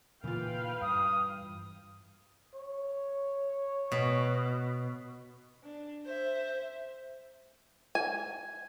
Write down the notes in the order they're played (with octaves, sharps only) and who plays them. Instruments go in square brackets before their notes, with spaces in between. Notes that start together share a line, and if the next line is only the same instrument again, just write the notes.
[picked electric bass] A#2 [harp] E3 F4 [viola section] B4 F5 G5
[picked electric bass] G2 [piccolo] D#6
[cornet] C#5
[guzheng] B2
[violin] D4
C5 E5
[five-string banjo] G#5